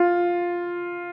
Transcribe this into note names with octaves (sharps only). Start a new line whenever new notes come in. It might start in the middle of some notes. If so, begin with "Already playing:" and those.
Already playing: F4